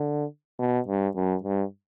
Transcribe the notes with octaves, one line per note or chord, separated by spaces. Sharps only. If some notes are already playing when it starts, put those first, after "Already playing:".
Already playing: D3
B2
G2
F#2
G2